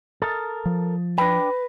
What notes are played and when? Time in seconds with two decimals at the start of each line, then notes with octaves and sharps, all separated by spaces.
0.22 A4 A#4 D#6 A6
0.66 F3
1.18 D4 B4 G5 B5 A#6